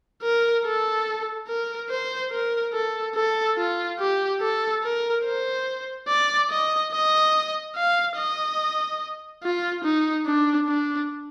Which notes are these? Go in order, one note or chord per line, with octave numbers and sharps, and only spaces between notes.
A#4
A4
A#4
C5
A#4
A4
A4
F4
G4
A4
A#4
C5
D5
D#5
D#5
F5
D#5
F4
D#4
D4
D4